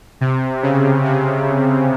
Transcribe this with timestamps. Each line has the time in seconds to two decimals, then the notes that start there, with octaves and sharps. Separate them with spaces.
0.21 C3
0.63 C#3
1.04 C3